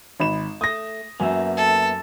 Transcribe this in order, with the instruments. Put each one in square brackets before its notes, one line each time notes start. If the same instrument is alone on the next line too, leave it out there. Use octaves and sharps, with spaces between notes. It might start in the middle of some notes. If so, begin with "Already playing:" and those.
[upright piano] G#1 B5 E7
[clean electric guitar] A3 [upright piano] D#6 A#6
[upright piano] F#2 G#5 [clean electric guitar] A#3 B3 E5
[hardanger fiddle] A4